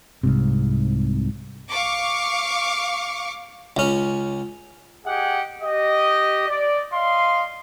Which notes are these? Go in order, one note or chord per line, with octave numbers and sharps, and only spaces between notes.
C2 G#2 C3
F5 C#6 D6
C#2 C#4
G4 G#4 D#5 F#5 G5
G4 D#5
D5
D#5 F5 C6